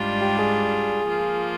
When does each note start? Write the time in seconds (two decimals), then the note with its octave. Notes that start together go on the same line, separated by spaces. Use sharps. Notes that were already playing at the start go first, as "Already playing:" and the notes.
Already playing: G#2 G3 D4 F4
0.21 G4
0.39 G#4
1.08 F3 A#3 F4